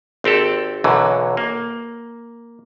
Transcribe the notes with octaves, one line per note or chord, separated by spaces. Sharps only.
G#1 C4 G4 A4
B1 F#2 D3 E3 F#3
A#3